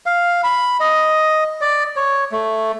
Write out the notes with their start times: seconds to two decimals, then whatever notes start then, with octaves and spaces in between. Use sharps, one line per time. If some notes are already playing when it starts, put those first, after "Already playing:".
0.06 F5
0.44 B5
0.80 D#5
1.61 D5
1.96 C#5
2.32 A3